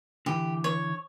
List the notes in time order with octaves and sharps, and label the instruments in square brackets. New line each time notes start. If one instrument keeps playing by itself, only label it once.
[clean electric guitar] D3 E3 [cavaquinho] G4
[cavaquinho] C#5